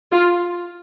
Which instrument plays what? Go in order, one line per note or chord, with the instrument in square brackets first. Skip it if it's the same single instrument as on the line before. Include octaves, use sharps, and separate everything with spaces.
[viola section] F4